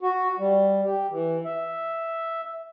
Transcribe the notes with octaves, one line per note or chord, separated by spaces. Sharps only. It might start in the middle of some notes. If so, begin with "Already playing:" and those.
F#4
G3
G4
E3
E5